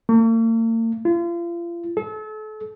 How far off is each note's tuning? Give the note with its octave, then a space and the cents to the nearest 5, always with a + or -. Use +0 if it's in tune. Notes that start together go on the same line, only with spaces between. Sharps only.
A#3 -45
F4 -35
A4 -35